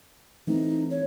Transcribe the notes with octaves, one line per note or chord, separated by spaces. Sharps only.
E3 A3 C4 D#4
C#5